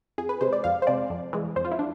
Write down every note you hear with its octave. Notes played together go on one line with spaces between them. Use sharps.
F2 G#4
B4
C3 G#3 C5
D5
F2 F5
C5
C3 G#3 D5
F2
E3 G#3
F2 C5
F4
E4
D4